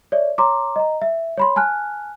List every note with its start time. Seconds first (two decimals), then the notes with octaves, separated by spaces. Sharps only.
0.12 C#5 D5 E5
0.38 C#5 A#5 C6 D6
0.76 D#5 A#5
1.02 E5
1.37 C#5 B5 C6
1.56 G#5 A5 F6 F#6